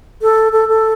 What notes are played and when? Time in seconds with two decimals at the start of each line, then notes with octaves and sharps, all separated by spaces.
0.22 A4
0.53 A4
0.69 A4